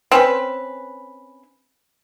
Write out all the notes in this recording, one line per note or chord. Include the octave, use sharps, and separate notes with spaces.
C4 C#4 B4